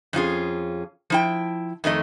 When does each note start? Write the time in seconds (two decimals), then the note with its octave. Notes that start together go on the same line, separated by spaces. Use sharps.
0.13 F2 C#4 F4 G#4
1.10 F3 E4 G5
1.84 F2 D#3 A3 D#5